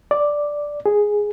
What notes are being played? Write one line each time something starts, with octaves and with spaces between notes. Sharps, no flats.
D5
G#4